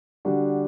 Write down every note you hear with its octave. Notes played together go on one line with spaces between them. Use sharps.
D3 G3 D4 F#4